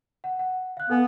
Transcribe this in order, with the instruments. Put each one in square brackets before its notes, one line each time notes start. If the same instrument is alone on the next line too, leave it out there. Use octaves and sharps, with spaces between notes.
[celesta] F#5
F#5
F5 F#6
[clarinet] B3 [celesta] A4 B4 G#5